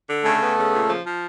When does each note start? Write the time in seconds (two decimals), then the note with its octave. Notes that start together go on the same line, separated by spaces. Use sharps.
0.08 D3
0.23 C#3 A3 A4
0.41 B3
0.56 C#3
0.72 A#2
0.88 F3
1.05 F3